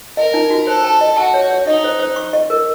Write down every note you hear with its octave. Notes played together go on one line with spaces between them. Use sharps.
A#4 D#5
D#4
F#4
A4 C5
A5
D#5
F#4 A5
C#5
C#5
D#4 D#5
C5
C5
C#6
D#5
A#4